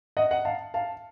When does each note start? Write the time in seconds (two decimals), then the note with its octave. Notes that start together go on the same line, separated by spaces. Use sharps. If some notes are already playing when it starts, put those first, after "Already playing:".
0.17 D#5 F#5
0.31 D#5 F#5
0.45 F5 A5
0.74 F5 A5